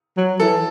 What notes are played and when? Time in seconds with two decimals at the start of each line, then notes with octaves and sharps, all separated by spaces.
0.17 F#3
0.40 E3 A4